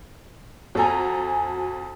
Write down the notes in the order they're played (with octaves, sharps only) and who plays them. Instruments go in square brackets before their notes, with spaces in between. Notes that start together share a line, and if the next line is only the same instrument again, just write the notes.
[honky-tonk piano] F2 A4 A#5 [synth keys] F#4 G#5